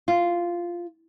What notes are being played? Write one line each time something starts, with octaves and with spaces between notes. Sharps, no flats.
F4